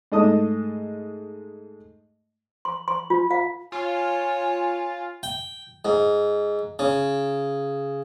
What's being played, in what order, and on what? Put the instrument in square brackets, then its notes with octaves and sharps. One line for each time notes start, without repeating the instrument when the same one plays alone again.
[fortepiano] G#2 G#3 A3 D#5 A5 D#6
[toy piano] C6
C6
F4
F5
[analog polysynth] F4 [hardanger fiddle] C#5 [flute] G#5
[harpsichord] G5
G#2
C#3